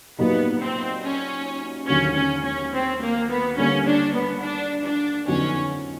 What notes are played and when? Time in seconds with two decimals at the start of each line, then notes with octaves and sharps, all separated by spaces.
0.19 A#2 F#3 A#3 B3 D#4 G4
0.60 C4
1.04 C#4
1.88 D#2 D3 F#3 A#3 C#4
2.17 C#4
2.45 C#4
2.74 C4
3.02 A#3
3.30 B3
3.57 D3 G3 A#3 C#4
3.87 D4
4.15 B3
4.43 D4
4.85 D4
5.28 F2 D3 F#3 B3 C#4 D#4